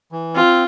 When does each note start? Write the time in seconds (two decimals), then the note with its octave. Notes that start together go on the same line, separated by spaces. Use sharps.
0.12 E3
0.35 C4 F4